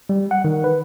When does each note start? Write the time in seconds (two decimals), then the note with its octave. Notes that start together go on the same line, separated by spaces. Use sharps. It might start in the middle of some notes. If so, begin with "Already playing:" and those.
0.09 G3
0.31 F#5
0.45 D#3
0.64 B4